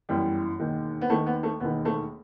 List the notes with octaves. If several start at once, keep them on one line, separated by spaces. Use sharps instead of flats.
G1 F#2 E3 G3
E1 D#2 D#3
B3
D#2 D#3 A3
B3
A3
E1 D#2 D#3 B3
A3